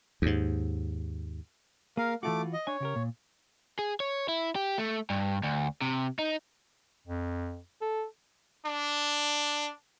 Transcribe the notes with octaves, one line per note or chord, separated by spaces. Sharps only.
D#2 G#2
A#3 G#4 A#4 F5
E3 A3 F4 F#4 D6
D#5
D4 C#5 G#5
C#3 G4 A#4
A#2
G#4
C#5
E4
G4
A3
G2
D2
C3
D#4
F2
A4
D4